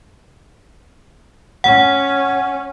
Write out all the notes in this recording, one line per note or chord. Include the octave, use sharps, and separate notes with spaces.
C#4 F#5